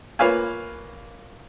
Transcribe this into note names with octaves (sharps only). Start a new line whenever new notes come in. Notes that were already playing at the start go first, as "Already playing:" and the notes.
A#3 F4 B4 C#5 F5 G#5